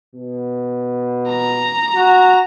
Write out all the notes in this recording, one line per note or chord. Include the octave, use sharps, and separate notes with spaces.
B2
A#5
F#4